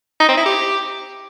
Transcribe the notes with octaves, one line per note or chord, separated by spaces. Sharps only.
D#4
C4
E4
G4